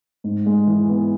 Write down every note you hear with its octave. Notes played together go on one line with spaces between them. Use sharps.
G#2
G#3
E3
B3